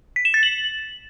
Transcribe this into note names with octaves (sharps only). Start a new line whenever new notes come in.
B6
E7
A6
F#7